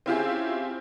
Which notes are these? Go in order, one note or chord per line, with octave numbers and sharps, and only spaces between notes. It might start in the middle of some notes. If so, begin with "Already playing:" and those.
C4 C#4 E4 F4 G4 G#4